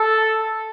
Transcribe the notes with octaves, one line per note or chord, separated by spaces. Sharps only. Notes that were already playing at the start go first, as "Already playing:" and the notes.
Already playing: A4